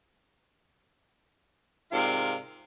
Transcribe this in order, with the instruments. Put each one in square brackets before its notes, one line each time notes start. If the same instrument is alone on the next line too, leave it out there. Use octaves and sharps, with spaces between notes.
[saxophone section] G#2 C3 F4 A#4 D5 F5